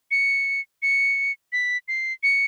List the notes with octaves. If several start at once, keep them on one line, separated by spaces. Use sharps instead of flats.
C#7
C#7
B6
C7
C#7